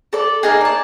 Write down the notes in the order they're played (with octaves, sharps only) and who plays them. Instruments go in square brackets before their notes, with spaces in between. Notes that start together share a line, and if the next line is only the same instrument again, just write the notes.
[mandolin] A4 D5
A#3 D#4 G#4
D5 A5